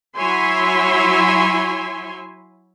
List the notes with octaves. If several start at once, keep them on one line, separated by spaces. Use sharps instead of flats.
F#3 E4 C#5 E5 G#5 C6